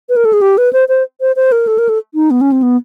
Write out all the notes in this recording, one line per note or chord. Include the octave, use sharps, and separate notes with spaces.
B4
A#4
A4
G#4
G4
B4
C5
C5
C5
C5
A#4
A4
A#4
A4
D#4
B3
C#4
C4
B3